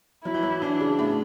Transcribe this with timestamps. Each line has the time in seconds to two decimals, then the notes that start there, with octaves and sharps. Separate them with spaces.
0.24 F#3 E4
0.34 E3
0.43 F#3
0.62 E3 D4
0.80 C#3
0.99 A2